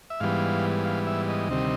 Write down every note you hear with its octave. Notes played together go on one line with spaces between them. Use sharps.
E5
G#2 E3 G3 B3 F5
F5
E5
D#5
D2 C3 D#3 G3 C4